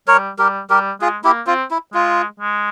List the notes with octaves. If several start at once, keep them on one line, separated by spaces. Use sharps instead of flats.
G3 A#4 C#5
G3 G4 A#4
G3 G4 A#4
G#3 F4 G#4
A#3 E4 G4
C4 F4
E4
G#3 F4
G#3